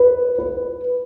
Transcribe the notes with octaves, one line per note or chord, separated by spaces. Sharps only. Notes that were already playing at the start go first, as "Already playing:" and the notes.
Already playing: B4
B4